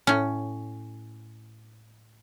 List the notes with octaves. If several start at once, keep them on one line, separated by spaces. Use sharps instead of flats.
A2 C#4